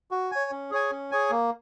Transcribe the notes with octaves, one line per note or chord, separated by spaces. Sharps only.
F#4
C#5 G#5
C#4
G#4 C#5 G#5
C#4
G#4 C#5 G#5
A#3